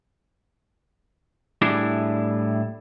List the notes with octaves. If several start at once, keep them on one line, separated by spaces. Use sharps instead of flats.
A2 G3 D4 E4 G#4